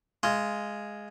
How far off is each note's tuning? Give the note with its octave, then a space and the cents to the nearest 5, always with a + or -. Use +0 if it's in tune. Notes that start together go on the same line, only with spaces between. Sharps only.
G#3 +0 F4 -15